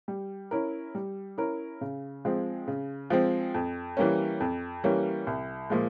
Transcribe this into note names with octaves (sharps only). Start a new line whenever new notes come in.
G3
C#4 E4 A#4
G3
C#4 E4 A#4
C#3
F3 G#3 C4
C#3
F3 G#3 C4
F2
E3 G3 A#3 C#4
F2
E3 G3 A#3 C#4
C2
A#2 F3 G#3